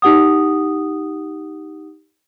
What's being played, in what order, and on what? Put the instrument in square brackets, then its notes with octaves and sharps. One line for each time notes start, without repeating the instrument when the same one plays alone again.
[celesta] D#4 G4 F#5 D#6